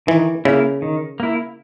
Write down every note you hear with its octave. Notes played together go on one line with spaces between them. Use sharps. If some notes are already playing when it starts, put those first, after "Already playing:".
D#3 E3
C#3 A#3 E4
D#3
A#3 E4